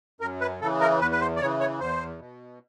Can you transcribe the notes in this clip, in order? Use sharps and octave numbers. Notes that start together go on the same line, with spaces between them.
F#2 A#4
B4
C#3 E3 A4
A#4
E2 B4
B4
C5
D5
C#3 E3 C#5
C#5
E2 C5
B2